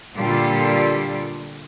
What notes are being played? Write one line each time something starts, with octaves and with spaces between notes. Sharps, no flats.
A#2 D3 G3 F4 G4 A4